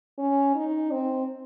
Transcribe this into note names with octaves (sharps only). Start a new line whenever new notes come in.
C#4
D#4
C4